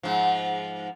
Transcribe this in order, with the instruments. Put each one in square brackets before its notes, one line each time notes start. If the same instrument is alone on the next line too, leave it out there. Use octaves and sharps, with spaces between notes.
[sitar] G#2 F3